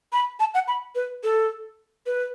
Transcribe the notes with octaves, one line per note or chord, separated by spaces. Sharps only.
B5
A5
F#5
B5
B4
A4
B4